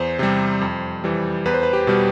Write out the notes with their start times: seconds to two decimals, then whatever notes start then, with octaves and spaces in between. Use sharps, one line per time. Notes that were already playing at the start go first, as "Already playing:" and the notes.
Already playing: E2 C5
0.19 C3 G3
0.61 F2
1.04 E3 G3
1.45 E2 B4
1.54 C5
1.63 B4
1.73 G4
1.87 B2 G3